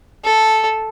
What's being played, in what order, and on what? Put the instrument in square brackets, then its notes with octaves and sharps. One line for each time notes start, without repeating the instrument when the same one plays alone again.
[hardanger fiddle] A4